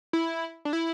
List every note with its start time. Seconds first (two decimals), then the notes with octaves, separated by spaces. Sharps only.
0.13 E4
0.65 D4
0.73 E4